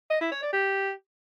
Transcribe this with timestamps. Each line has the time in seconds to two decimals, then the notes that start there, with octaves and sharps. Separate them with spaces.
0.10 D#5
0.21 E4
0.32 C#5
0.42 D5
0.53 G4